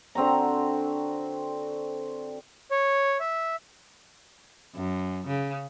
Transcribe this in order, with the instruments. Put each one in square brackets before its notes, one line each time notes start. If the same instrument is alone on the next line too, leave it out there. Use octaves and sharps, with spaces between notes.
[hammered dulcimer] D3 C4 F#4 A#5
[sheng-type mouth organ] C#5
E5
[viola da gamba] F#2
C#3